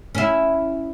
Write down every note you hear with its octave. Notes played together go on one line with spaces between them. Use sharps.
C#4 E4